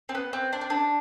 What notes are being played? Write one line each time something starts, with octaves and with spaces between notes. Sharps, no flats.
C4
B3
C4
D4
C4
D4